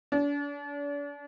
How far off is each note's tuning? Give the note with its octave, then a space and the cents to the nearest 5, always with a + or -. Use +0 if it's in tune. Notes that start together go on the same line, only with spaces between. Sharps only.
D4 -40